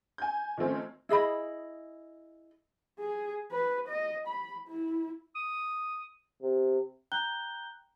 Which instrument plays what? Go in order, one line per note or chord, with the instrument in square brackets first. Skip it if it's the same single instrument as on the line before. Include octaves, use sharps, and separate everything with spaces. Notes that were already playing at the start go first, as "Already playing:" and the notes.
[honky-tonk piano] G#5 G6
D#3 F3 A3 C4 C#4
[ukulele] E4 G#4 D#5 B5
[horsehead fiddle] G#4
B4
D#5
B5
E4
[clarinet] D#6
[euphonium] C3
[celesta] G5 A#5 F#6 G6 G7